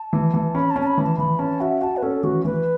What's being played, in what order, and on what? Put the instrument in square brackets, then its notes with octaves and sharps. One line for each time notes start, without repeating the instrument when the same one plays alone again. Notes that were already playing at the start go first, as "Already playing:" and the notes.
Already playing: [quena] A5
[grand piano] E3
E3
[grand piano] C#4 [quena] B5
[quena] A5
[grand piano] C#4
[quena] A5
B5
[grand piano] E3
[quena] A5
[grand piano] E3 [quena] B5
[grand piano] C#4 [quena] A5
[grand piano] F#4 [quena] E5
[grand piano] F#4 [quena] A5
[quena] B4
[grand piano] C#4 [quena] A4
[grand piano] E3 [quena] F#4
[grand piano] E3 [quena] B4